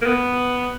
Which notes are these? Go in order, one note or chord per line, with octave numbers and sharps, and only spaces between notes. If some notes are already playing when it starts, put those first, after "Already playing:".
A#3
B3